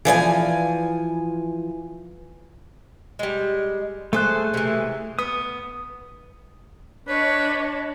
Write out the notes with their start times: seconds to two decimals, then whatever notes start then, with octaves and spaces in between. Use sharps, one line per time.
0.05 E3 F3 D5 G#5
3.19 G3 G#3
4.13 A3 G#4 A4 C5 F#6
4.54 C3 E3
5.19 B3 D#6
7.08 D4 B4 C#5 D#5